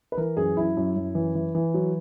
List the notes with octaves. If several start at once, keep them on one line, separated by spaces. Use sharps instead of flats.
B4
E3 A#4
F#2 G#4
F#2 E4
F#2
F#2
E3
E3
E3
F#3